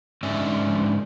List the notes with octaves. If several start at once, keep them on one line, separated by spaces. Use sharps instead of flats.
G#2 D3 C#4 D5 E5 G#5